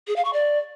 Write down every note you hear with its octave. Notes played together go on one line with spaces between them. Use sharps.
G#4
F5
C#6
D5